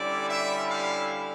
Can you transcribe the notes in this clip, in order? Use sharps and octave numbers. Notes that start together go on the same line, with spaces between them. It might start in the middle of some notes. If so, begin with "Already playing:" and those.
Already playing: D3 G3 C#4 E4 D5
E5
F5